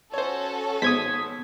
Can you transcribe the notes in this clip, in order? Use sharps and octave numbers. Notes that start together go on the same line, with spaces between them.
C#4 F#4 A4 C5 C#5
G#1 G#3 B3 C5 D#6 G#6 B6